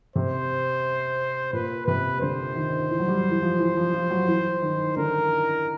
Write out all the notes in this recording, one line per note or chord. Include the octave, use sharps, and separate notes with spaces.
C3 C5
A#2 B4
C3 B4
D3 C5
D#3
E3
F#3
G3
E3
F3
E3
F3
F3
F#3
E3
D#3
D3 A#4